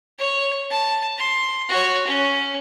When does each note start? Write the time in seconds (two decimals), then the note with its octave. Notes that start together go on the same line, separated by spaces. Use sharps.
0.19 C#5
0.71 A5
1.18 C6
1.69 F#4 C#5
2.07 C#4